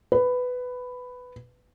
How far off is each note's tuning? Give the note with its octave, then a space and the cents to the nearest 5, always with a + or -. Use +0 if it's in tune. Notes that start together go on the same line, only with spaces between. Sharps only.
B4 +10